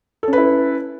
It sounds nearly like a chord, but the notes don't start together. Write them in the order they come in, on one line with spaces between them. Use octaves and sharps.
A4 C#4 B4 E4